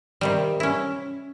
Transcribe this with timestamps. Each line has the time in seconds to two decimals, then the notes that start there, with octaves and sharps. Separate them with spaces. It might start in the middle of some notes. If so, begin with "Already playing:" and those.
0.21 C3 D#3 G3
0.60 C#4 E4